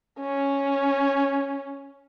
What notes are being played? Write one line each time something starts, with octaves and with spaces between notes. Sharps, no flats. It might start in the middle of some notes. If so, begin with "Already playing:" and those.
C#4